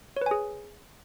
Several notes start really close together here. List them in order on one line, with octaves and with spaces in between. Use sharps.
C#5 B4 G#5 G#4